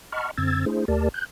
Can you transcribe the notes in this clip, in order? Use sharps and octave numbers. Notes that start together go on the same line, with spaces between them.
D#5 F#5 A5 B5 C#6 F6
F#2 D3 C4 E6 G#6 A6
A3 D4 E4 G#4 C5
D#2 A3 G4 A#4 D5 A5
F#6 G6